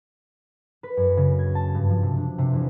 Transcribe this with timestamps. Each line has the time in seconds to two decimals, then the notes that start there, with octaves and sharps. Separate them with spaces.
0.83 B4
0.97 F#2
1.17 C#3
1.39 G#6
1.55 A5
1.75 G2
1.90 F3
2.03 C3
2.17 D4
2.38 C3
2.53 E2